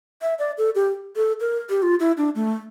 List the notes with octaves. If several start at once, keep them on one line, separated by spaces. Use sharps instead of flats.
E5
D5
A4
G4
A4
A#4
G4
F4
E4
D4
A3